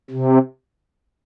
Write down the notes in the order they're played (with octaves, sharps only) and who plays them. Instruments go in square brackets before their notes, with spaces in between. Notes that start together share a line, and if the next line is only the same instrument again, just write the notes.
[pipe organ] C3